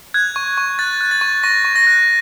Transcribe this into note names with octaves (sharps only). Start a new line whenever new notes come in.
F#6 G#6
C#6
C#6
F#6 A6
F#6
A6
C#6
C#6 A#6
C#6
A#6
F#6